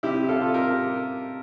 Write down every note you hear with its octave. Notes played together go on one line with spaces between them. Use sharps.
C3 E4 G4
F4 A4
C3
G4 A#4